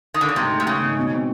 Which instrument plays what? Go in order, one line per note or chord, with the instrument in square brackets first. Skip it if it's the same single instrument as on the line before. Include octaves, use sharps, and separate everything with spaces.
[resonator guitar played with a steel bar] D#3
D3
C#3
[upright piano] G#2 [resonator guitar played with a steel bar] C3
[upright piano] A3
[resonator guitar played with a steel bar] C3
[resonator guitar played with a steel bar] C#3 [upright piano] E3
[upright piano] G#2
B2
C4